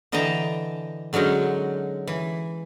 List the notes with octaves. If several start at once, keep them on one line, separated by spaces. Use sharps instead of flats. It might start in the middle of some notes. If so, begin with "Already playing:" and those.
D3 E3 D#5 G5 A5 A#5
D3 F#3 G#3 C#4 D#4
E3